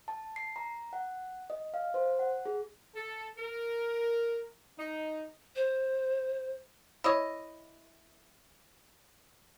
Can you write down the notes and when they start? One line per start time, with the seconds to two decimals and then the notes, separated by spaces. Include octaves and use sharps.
0.08 A5
0.36 C7
0.56 A#5
0.93 F#5
1.50 D#5
1.74 F5
1.94 C5
2.19 F#5
2.46 G#4
2.95 A4
3.38 A#4
4.78 D#4
5.56 C5
7.04 E4 C#5 D#5